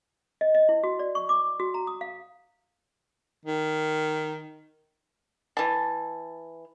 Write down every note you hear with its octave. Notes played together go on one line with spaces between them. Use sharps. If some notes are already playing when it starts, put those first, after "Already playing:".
D#5
D#5
E4
F#4
D5
C#6
D6
F#4
A#5
D#6
F5
D#3
E3 A5